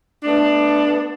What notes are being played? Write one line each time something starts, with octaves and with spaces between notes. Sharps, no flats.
A3 B3 D4